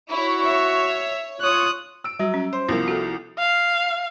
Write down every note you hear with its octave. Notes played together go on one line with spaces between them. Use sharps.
E4 F#4 C#5 C#6
C#5 E5
F4 C#5 D#6 F#6
E6 D7
F#3 G3
C#4
C5
C2 F3 B3 A#4
F#4 A4
F5